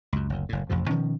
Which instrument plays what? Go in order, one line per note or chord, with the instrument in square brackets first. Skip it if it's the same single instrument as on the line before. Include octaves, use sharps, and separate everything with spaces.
[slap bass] C#2 F#2
F#1 D2
F#1 A2
A1 F2 C3 F3
B2 D#3 F3 C#4